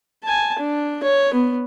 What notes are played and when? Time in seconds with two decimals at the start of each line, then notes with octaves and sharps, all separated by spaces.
0.23 G#5 A5
0.59 D4
1.04 C#5
1.34 B3